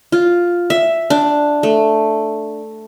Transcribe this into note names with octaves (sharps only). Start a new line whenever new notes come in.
F4
E5
D4
A3